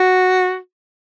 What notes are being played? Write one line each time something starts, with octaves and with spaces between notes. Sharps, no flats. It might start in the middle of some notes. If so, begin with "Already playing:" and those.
Already playing: F#4